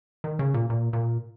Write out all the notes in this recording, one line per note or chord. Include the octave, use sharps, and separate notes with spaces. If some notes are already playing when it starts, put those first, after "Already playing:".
D#3
C#3
A#2
A#2
A#2